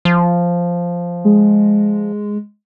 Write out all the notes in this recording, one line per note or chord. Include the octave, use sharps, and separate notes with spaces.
F3
G#3